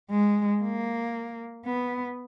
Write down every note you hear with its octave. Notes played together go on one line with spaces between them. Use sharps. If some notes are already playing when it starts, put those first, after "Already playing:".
G#3
A#3
B3